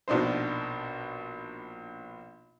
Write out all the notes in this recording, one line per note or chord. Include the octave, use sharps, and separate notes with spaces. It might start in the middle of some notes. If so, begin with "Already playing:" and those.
A#1 B2 D4 D#4 C5